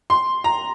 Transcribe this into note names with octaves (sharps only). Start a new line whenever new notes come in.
C6
A#5